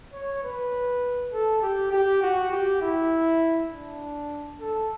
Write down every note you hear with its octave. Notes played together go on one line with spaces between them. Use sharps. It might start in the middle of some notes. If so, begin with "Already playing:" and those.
C#5
B4
A4
G4
G4
F#4
G4
E4
D4
A4